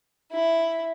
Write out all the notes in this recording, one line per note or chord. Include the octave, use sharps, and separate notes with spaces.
E4